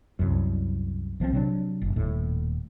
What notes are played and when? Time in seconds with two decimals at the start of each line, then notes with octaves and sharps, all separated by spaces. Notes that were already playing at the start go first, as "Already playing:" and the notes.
0.19 C2 F#2
1.20 B1 F3 G#3 C4
1.33 C3 F#3 D4
1.82 F#1
1.96 D#1 A2